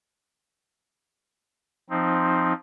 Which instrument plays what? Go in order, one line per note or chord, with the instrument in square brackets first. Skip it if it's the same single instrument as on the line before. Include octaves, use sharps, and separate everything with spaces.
[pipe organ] F3 C4 D#4